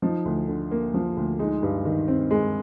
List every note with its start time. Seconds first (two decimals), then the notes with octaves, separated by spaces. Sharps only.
0.02 F3 D#4
0.25 D2
0.48 D3
0.71 A#3
0.94 F3
1.17 D2
1.39 G#3 D#4
1.63 G2
1.85 D#3
2.08 C4
2.31 G#3